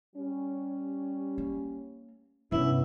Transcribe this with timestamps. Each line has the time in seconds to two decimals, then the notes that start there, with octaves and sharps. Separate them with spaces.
0.16 G3 C#4
1.38 A#3
2.52 G2 C3 B3 C#4 E4